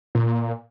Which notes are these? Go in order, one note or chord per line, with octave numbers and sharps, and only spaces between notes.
A#2